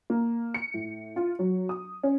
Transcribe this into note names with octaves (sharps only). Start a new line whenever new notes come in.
A#3
C#7
A2
F4
F#3
D#6
C#4